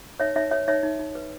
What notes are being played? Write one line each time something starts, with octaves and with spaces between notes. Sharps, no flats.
D#4 C#5 E5
D#4 C#5 E5
B4 C#5 E5
D#4 C#5 E5
D#4
D#4
B4